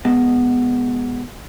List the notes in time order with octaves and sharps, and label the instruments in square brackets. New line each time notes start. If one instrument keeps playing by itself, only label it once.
[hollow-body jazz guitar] B2 G#3